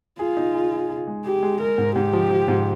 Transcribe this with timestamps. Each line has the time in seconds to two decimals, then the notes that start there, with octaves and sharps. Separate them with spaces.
0.19 F4 G#4
0.37 D#4
0.54 G#4
0.72 G#4
0.89 G#4
1.07 G#3
1.25 G4 G#4
1.43 G#3
1.60 G#3 A#4
1.78 G#2
1.95 G#2 G4
2.13 F3
2.30 F3
2.48 G#2